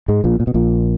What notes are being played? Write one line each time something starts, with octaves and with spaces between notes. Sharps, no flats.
G#2 G#3
A#1 A#2
A#2
B2
A#1 A#2